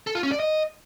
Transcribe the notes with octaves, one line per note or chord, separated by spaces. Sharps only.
A4
F4
C#4
D5
D#5